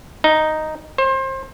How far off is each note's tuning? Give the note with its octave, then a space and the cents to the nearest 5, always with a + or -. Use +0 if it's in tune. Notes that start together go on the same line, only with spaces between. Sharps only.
D#4 +0
C5 +30